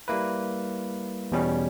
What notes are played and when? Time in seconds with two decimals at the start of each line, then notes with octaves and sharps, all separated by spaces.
0.08 G3 A#3 E4 B4
1.32 E2 B2 G3 C#4